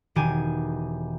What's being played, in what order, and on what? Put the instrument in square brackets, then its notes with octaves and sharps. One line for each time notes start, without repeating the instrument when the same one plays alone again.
[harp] E1 D#3 G4 G#4 G#5